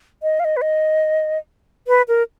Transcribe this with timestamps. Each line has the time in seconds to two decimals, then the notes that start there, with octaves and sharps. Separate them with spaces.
0.23 D#5
0.40 F5
0.45 D#5
0.57 B4
0.62 D#5
1.88 B4
2.08 A#4